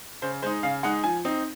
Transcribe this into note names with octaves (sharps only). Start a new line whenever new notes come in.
C#3 C5
G#3 D#4 C5
C#3 F5
G#3 D#4 F#5
F3 G#5
C4 D#4